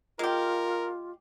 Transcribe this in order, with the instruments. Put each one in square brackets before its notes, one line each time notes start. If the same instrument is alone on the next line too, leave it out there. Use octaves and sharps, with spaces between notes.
[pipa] G#3 G4 [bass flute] F4 [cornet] A#4